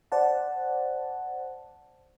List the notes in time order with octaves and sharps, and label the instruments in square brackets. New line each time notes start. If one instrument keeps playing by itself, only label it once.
[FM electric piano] C5 D5 F#5 A5